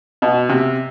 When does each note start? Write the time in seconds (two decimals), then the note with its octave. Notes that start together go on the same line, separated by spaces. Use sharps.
0.22 B2
0.49 C3